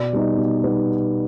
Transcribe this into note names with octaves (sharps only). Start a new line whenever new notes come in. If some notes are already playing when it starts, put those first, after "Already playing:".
Already playing: B2 D5
G3 B3 D#4
B2
G3 B3 D#4